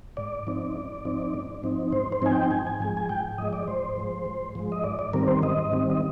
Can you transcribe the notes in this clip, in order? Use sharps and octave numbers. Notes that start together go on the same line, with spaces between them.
G#2 D5
F3 C4 D#4
G#2
F3 C4 D#4
G#2
F3 C4 D#4
G#2 C5
C5
F3 C4 D#4 G#5
G5
G#2 G#5
G#5
F3 G#3 G#5
G#5
G#2 G5
F3 G#3 D#5
D5
G#2 C5
F3 G#3
G#2
F3 G#3
D#5
G#2 D5
D5
D#3 G3 C4 A#4
C5
G#2 D#5
D#3 G3 C4
D#5